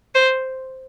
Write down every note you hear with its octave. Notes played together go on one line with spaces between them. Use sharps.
C5